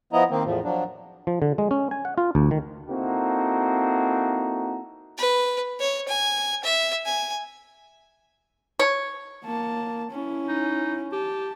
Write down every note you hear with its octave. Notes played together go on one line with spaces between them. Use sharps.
F3 B3 E4 D#5 A#5
D#3 A#3 C4
E2 A2 F3
F3 F#3 D4
F3
D3
G#3
C#4
G#5
F#5
F4
D2
D#3
A#3 C4 D#4 E4 F#4 A4
B4
C#5
G#5
E5
G#5
C#5
A#3 A5
C#4 E4
D#4
G4 A5